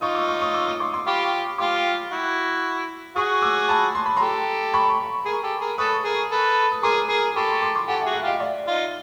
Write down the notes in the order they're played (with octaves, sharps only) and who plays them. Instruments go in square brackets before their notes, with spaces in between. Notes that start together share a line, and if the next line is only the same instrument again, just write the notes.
[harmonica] D#4 F4 [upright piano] C#6 D#6
[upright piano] D6 E6
C#6 D#6
C#6 D#6
D6 E6
C#6 D#6
C6 D6
C6 D6
[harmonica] F4 G4 [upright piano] B5 C#6
[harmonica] F4 G4 [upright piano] C6 D6
[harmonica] E4 F#4
[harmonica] F#4 G#4 [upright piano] C#6 D#6
[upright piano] D6 E6
A5 B5
C6
B5
[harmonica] G4 A4 [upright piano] A#5 C6
[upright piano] B5 C#6
[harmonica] G#4 A#4
G4 A4
G#4 A#4
[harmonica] A4 B4 [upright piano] C#6 D#6
[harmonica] G#4 A#4
A4 B4
[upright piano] D#6
[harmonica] G#4 A#4 [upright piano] C6 D6
[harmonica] G#4 A#4
[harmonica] G4 A4 [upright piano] B5 C#6
[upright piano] A#5 C6
C6 D6
C6 D6
[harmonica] G4 A4 [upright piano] F#5 G#5
[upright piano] E5 F#5
[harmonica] F#4 G#4
[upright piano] E5 F#5
[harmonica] F4 G4 [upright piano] D#5 F5
[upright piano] D5 E5
[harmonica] D#4 F4